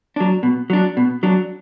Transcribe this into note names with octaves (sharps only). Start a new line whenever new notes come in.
F#3 D4
B2
F#3 D4
B2
F#3 D4